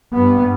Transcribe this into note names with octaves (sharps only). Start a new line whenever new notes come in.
G2 B3